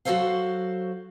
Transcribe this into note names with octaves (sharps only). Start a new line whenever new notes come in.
F#3 F#4 G#4 A4 C5 F5